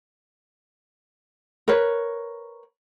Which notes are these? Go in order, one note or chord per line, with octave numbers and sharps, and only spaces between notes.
A#4 B4 C#5